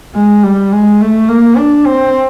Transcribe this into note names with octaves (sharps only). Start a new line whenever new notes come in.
G#3
G3
G#3
A3
A#3
D4
C4